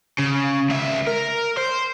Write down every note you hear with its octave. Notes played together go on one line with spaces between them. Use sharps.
C#3
C#2 E5
A#4
C5